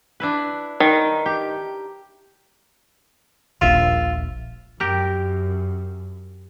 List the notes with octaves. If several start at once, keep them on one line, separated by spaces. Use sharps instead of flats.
D4 E4 B4
D#3 A#4 B4
G4
D#1 A#1 F4 E5
F#2 G4 A#4